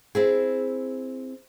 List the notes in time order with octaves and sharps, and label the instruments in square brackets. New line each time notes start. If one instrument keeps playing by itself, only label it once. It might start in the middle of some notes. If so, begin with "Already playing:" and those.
[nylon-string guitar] C4 E4 G#4